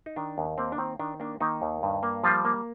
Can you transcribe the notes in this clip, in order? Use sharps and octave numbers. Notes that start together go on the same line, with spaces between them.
D#4
D#3 D4
D#2
A#3 C4
D4
D#3 C4
D#3 D4
A#3 D4
D#3 A#3 D#4
D#2
G2
A#3
F3 G3 F4
A#3